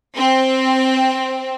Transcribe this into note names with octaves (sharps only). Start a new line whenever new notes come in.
C4